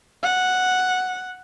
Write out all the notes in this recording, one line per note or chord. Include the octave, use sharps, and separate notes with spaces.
F#5